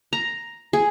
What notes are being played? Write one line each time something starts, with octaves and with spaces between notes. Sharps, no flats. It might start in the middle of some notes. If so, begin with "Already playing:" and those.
A#5
G#4